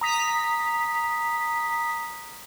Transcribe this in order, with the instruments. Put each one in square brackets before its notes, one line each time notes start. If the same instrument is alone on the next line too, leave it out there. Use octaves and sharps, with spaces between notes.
[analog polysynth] A#5 D#6 B6